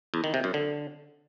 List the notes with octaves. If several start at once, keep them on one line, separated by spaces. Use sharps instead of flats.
E2
D#3
C3
F#2
D3